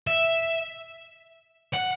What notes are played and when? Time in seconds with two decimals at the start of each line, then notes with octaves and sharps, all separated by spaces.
0.07 E5
1.74 F#5